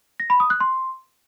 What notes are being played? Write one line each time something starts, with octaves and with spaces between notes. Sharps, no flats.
A#6
B5
D#6
F#6
C6